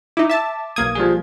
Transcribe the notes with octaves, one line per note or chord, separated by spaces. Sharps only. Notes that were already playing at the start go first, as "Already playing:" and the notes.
D#4 E4 D6
E5 A5
B1 A#3 D#6 G#6
F3 G3 G#4